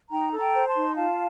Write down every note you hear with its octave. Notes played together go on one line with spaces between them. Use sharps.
D#4 G5 A#5
A4
G5 A#5
C5
A5 C6
D#4
F4 F5 A5